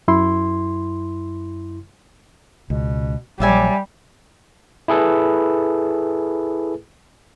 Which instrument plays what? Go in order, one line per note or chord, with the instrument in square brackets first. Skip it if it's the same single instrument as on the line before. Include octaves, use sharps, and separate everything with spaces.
[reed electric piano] F#2 E4 C6
[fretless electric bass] C#2 [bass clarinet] B2
[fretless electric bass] A#1 [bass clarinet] F#3 [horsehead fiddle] G3 [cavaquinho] D5 E5 G#5
[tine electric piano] E4 G#4 A4 B4